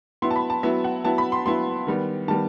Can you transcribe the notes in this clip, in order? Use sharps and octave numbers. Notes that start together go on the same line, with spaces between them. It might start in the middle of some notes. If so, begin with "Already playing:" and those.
F#3 B3 E4 C6
A5
B5
A5
F#3 B3 E4 E5
F#5
F#3 B3 E4 A5
B5
C6
F#3 B3 E4 C6
D#3 G3 B3
D#3 G3 B3 A5